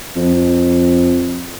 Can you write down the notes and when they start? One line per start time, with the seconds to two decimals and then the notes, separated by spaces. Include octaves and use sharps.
0.16 F2